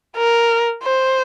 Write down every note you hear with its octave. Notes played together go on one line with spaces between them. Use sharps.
A#4
C5